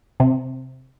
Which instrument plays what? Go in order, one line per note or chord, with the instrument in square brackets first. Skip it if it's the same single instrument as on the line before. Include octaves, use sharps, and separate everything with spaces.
[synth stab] C3